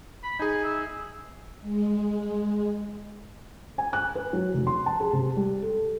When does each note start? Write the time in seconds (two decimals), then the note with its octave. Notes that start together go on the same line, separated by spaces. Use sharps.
0.23 B5
0.39 D#4 G#4 G#5
0.64 E5
1.61 G#3
3.78 G#5
3.93 F#6
4.15 B4
4.33 F#3
4.54 F1
4.67 C6
4.86 A5
5.00 G#4
5.13 C3
5.36 G3
5.62 A4